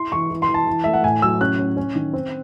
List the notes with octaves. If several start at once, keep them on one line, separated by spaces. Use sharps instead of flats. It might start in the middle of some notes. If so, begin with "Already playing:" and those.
Already playing: E4 C6
E3 C#6
E3
C6
E3
A5
E3
A3 E5
F#5
A2 G#5
F#3 E6
C#4 F#6
C#4
C#4
D#3
C4